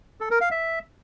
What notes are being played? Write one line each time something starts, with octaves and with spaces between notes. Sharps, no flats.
A4
A#4
F5
E5